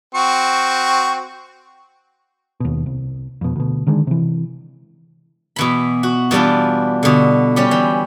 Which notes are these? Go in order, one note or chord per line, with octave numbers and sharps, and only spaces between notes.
C4 F#4 C#6
D#2 B2
C2
F2 B2
D2 B2
D3 D#3 G#3 D4
C3 E3
B2 E3 B5
F#4
E3 G3 B3 D4 F4
B2 D3
G3 C#4 G4
E3